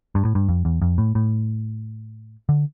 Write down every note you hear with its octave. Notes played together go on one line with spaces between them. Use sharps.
G2
A2
G2
F2
E2
F2
A2
A2
D3